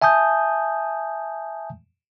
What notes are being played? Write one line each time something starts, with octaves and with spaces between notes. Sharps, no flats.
E5 G#5 A5 D#6 G6